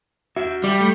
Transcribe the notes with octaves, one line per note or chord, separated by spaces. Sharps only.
F#4 E5
G3
A3